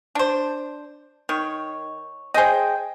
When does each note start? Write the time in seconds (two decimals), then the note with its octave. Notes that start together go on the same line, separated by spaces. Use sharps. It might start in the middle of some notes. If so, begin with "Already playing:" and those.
0.15 D4 C5
1.29 D#3 C#5
2.34 G#4 C5 D#5 G5